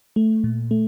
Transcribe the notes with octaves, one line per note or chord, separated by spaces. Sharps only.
A3
A#2
A3